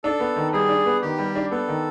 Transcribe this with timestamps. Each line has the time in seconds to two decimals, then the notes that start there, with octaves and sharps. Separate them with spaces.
0.04 D4 A4
0.20 B3
0.36 D#3
0.53 G3 G#4
0.69 D4
0.86 B3
1.02 D#3 G4
1.18 G3
1.36 D4
1.51 B3 A4
1.68 D#3